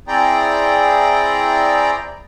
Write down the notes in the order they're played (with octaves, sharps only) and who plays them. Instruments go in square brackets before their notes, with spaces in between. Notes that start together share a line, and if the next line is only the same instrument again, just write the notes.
[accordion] C4 E4 G#4 D5 G5 A#5